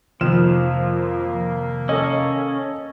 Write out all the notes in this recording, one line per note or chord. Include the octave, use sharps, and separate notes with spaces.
F2 C3 D#3 F3 A#3 F6 E7
C#4 A4 D#5